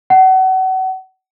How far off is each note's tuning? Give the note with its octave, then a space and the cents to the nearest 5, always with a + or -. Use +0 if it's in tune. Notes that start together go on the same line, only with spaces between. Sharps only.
F#5 +30